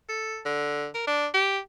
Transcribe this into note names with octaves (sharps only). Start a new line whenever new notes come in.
A4
D3
A#4
D4
G4